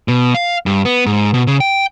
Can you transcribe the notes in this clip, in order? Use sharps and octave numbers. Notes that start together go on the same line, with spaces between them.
B2
F5
G2
B3
G#2
B2
C#3
G5